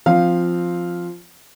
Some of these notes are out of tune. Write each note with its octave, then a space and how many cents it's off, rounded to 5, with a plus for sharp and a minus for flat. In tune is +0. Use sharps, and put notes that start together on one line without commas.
F3 +0 C4 +0 F5 +0